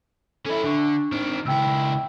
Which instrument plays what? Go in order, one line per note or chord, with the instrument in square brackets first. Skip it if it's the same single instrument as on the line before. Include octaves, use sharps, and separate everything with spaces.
[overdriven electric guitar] C#4 E4 [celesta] A4 E5
[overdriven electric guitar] D3 [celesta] D4 C#6
[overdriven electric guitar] D#3 C4
[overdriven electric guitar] C#2 E4 [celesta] G5 E6